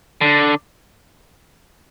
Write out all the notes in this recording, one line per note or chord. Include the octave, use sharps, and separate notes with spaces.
D3